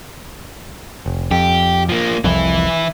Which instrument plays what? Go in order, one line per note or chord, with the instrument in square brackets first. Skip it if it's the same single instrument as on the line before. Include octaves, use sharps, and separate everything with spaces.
[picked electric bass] F1
[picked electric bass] F2 [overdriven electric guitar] G4
[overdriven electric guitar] F3 A#3
[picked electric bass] F1 C2 F2 [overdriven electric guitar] E3 E4